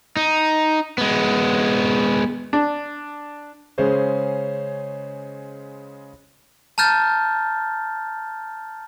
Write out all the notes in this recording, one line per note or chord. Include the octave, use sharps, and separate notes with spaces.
D#4
G#3 B3
D4
C#3 G#3 C#4 G#4 C5 C#5
A5 A#5 F6 G6 A6